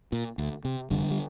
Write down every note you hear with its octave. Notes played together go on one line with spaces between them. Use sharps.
A#2
D2
C3
F1 D3 G3
G3